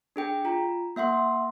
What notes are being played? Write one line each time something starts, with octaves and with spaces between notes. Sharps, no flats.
D4 G#4 G5
F4 A#5
A#3 E5 F#5 C6